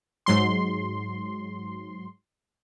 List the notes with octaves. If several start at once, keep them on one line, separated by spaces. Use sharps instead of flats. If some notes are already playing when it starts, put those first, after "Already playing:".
G#2 F#3 C6